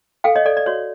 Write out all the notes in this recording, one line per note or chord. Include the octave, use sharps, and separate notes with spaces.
A4 F5 G5
C#5 D#5
A4 D5
D5
F#4 C#5